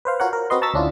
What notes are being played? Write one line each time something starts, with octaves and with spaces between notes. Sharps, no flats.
B4 C5 F5
F4 F#4 A#4 C#5 F#5
A#4
C4 F#4 B4 D#5 C6
A5 A#5 C#6 E6 A6 B6
D2 C#4 D4 E4 F4